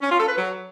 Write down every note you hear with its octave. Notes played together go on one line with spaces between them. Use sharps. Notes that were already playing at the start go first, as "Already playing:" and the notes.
C#4
F4
A4
B4
F#3